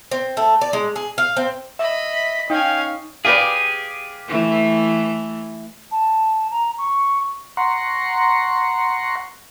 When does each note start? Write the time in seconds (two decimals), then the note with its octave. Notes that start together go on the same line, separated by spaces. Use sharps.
0.11 C4
0.37 A3
0.61 D5
0.73 G#3
0.96 G#4
1.18 F5
1.37 C4
1.79 D#5 E5 B5
2.14 B6
2.50 C#4 D#4 F5 G5 G#5
3.25 G4 G#4 B4 D5 F5
4.28 E3 A3
5.91 A5
6.51 A#5
6.78 C#6
7.57 F#5 A#5 C6 C#6